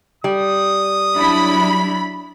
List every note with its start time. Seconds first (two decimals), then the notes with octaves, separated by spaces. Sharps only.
0.24 G3 D#6
1.17 F#3 D4 E4 B5